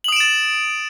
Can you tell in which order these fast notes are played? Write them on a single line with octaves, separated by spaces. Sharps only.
F#7 D#6 D7 E7 A6